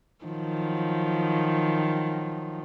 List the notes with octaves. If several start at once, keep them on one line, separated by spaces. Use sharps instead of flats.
D#3 F3 F#3